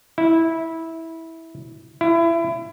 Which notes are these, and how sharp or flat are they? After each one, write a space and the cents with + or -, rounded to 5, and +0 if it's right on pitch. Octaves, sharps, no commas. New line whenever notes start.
E4 -15
E4 +25